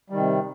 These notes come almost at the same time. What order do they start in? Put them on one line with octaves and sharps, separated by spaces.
G3 D#3 C3